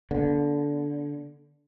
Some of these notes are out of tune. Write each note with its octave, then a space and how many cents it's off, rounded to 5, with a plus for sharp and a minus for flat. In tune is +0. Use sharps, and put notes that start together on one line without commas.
D3 -15 A#3 +45